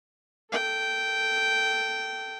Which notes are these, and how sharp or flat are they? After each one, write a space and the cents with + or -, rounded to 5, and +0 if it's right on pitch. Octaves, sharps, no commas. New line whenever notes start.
A4 +5 G5 -10